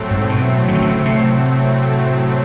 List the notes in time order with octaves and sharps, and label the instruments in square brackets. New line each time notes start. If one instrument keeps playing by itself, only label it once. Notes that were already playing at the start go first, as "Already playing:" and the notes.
Already playing: [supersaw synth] A2 F#3 A3 C4
[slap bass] G#2
A#2
B2
C#3
D3
C#3
C3